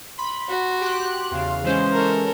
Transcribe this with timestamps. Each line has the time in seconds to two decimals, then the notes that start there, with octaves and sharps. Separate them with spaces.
0.18 B5 C6
0.48 F#4
0.81 G4 F#6
1.31 E2 C#3 F5
1.63 E3 G#3 C#4 C5
1.93 A4 A#4